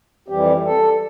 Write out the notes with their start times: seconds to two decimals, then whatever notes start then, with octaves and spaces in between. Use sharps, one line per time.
0.28 F2 E3 G3 G4
0.65 A4